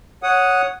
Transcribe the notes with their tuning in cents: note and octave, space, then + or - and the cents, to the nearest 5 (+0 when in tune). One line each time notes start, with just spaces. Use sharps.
C#5 +0 F#5 -5 D#6 +0